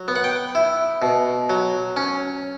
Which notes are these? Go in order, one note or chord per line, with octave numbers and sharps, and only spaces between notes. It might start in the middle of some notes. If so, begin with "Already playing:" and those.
Already playing: F#3
B3
F#5
G5
E4
B2
F#3
C#4